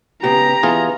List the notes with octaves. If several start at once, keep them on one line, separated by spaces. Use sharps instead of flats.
C#3 B3 G4 A#5
E3 B3 F4 G#4